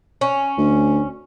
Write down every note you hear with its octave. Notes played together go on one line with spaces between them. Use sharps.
C#4
D2